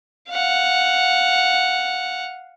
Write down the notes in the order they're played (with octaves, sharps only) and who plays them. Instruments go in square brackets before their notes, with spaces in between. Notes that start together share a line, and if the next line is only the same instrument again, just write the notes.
[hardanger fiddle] F5 F#5